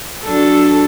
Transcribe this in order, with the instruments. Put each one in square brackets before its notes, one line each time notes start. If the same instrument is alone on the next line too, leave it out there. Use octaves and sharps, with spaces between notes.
[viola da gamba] F#3 D4 [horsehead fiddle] A4